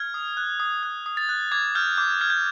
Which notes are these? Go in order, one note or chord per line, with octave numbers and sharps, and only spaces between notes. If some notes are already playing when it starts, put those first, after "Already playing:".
Already playing: F6 G#6
D#6
F#6
D#6
F#6
D#6
A6
F#6
D6 G#6
F6 G6
D6 G6
F6 G#6
G6